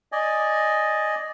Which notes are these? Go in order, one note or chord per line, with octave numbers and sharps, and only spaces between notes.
D5 D#5 G#5